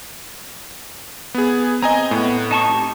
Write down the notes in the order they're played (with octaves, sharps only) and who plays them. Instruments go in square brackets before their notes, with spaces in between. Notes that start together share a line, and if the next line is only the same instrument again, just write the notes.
[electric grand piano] B3 G#4
[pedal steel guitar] C4 [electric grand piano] D#5 G#5 A#5
[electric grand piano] A2 [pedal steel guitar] B3
[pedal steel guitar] D#4 A5 C#6
C4 D#4 G4